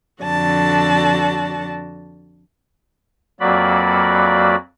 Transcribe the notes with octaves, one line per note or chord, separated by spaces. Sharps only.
F2 D3 F#4 D5 A5
F2 F#3 A#3 F#4 D5 B5